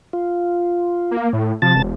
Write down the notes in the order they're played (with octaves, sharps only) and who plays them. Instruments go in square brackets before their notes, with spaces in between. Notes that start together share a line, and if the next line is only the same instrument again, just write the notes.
[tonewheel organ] F4
[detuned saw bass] A#3
A2
[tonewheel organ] C3 A5 A6 [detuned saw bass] F3
[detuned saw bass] E1